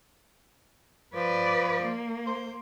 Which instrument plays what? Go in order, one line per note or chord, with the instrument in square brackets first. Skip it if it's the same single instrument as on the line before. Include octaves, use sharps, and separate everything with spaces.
[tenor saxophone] F3 [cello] B4 D5
[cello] A#3
[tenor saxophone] C5